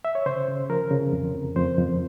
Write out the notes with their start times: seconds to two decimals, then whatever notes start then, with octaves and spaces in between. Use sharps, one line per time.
0.05 E5
0.15 C#5
0.26 C#3 C5
0.48 C#3
0.70 F3 A#4
0.91 C#3
1.13 F2
1.35 F2
1.56 F2 C5
1.78 F2